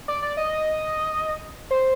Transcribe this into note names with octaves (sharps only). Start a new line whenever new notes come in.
D5
D5
D#5
C5